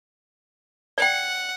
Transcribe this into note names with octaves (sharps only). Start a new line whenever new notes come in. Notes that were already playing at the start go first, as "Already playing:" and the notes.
D5 F#5 G5